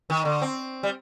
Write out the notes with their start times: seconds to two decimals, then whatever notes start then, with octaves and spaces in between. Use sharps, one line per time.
0.10 D#3
0.25 D3
0.42 C4
0.83 G3